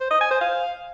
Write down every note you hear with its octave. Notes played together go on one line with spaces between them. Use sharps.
C5
D#5
G#5
C5
F5